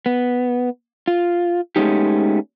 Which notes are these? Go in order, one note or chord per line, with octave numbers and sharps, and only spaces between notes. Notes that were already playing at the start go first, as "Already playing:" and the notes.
B3
F4
G#3 A3 B3 C#4 D#4 G4